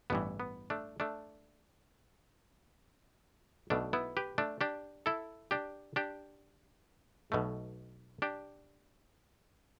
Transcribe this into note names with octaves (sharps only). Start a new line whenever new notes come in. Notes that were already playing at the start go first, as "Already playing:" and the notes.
A1 G2 E3 B3
B3
A3 D4
A3 D4
B1 B2 A3 D4
B3 E4
G4 B4
A3 D4
D4 G4
E4 A4
D4 G4
D4 G4
B1 B2 A3
D4 G4